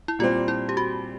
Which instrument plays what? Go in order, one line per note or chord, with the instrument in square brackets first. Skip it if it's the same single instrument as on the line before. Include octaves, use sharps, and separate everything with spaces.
[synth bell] E4
[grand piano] A#2 G3 C4 [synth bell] F4
[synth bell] E4
G4
F#4